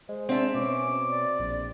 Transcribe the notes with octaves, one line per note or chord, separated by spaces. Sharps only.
G#3 C5
C4 D4 D5 E5
B2 C#4 D6
D5
A#1